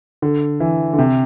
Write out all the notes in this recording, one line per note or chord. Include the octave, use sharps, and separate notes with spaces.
D3
E3
D3
C3